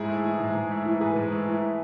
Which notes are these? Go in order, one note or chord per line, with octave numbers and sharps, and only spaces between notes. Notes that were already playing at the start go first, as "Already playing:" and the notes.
Already playing: G#2 E4 G#4
A3
E3
G#2
G#2
A3
E3
G#2 G#4 B4
G#2
A3
E3